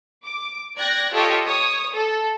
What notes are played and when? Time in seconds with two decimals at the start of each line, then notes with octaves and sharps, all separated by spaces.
0.24 D6
0.77 D5 G5 F#6 G#6 A#6
1.12 F4 G4 A4 C#5 D#5
1.46 C#5 D#6
1.93 A4